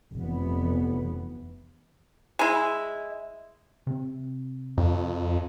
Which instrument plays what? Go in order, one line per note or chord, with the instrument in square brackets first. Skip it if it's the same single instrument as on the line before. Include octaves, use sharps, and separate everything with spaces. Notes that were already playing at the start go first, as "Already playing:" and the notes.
[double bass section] F1 E3 B3
[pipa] G#3 E4
[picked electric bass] C3 C4
[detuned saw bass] F2